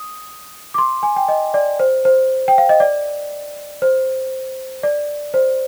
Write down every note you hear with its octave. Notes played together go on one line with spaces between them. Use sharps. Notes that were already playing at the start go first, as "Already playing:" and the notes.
Already playing: D#6
D6
C6
G#5
G5
D#5
D5
C5
C5
G5
F5
D#5
D5
C5
D5
C5